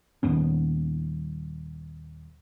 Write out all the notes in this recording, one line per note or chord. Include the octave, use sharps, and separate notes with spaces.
D#1 D#2 B3 C#4